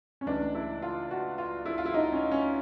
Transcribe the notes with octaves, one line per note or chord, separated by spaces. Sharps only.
C#4
C#2 C#3 E3 A3 D4
E4
F4
F#4
F4
E4
F4
E4
D#4
C#4
C#4